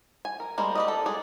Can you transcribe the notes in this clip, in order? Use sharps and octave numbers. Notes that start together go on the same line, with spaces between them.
G#5
A#4
G3 G#3 A#3 A#4 C5
G4 D5 D#5
A4
G#3 G#4 D5